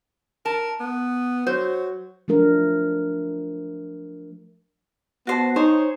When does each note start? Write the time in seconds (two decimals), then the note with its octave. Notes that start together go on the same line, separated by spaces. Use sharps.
0.45 A#4 A5
0.80 B3
1.47 F#3 C5
2.28 F3 F#3 A3 D4 A#4
5.27 B3 F#4 C5 A5
5.56 D#4 C5 C#5 G#5